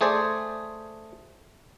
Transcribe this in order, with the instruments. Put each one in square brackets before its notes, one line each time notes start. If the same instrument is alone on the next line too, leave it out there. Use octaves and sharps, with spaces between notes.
[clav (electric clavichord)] A3 G#4 C5 D5